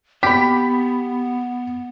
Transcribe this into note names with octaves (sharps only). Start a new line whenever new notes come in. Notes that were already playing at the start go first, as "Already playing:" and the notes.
B3 G4 B5 B6